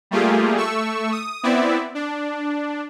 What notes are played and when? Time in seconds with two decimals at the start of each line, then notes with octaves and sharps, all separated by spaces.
0.11 G3 A3 A#3 F4 G4 G#4
0.57 A3 C#6 E6
1.12 D#6
1.43 B3 C4 E4 D5 E5
1.95 D4